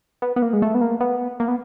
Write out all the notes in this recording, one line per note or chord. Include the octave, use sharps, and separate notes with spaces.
B3
B3
A#3
G#3
A3
B3
A#3
B3
A#3
B3